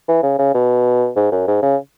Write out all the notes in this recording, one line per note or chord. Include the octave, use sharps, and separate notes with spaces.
E3
C#3
C#3
B2
G#2
F#2
G#2
C#3